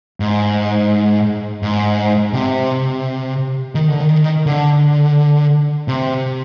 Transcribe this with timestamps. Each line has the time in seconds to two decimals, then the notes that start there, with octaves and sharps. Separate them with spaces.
0.20 G#2
1.63 G#2
2.33 C3
3.75 D#3
3.88 D3
4.00 D#3
4.46 D3
5.88 C3